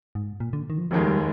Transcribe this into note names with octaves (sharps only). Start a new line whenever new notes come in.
G#2
A#2
D3
D#3
F3
F1 D#2 D#3 F3 G#3
G3